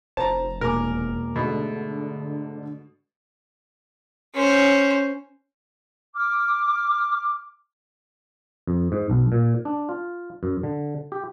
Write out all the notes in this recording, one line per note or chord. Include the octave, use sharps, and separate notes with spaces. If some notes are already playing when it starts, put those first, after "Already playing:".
F1 C5 A5 A#5
E1 A#3 A#4 G#5 D6
G#2 B2 D3 A3
C#4 C5
D6 F6
F2
G#2
B1
A#2
D4
F4
F#2
D3
G4